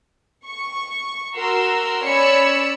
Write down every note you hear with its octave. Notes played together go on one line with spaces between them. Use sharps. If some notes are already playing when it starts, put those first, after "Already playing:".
C#6
F#4 A#4 A#5 C6 E6
C#4 C#5 D5 B5 E6 C#7